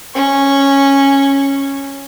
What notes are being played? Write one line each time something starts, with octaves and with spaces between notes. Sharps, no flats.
C#4 C#6